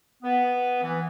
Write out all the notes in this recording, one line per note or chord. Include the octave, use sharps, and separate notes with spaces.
B3
E3